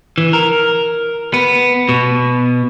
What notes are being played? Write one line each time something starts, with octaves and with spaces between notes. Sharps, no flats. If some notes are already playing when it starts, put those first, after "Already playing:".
E3
A#4
B3
B2